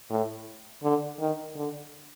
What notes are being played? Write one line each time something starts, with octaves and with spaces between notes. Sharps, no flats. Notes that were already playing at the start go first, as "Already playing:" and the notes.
A2
D3
D#3
D3